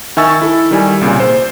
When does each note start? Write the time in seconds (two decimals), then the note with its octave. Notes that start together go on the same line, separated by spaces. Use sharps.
0.17 D#3 E5 G#5 C#6 E6 A6
0.42 E4 A4
0.71 D#3 G3 G#5
1.01 C2 A#2 C#3
1.20 C5